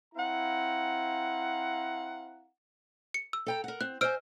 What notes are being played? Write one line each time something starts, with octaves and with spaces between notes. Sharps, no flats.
C4 E4 F5 F#5 A#5
C#7
E6
A4 G5 A#5
A#4 F#5
C4 F#6
C5 D#5 G#5 E6 F6 D7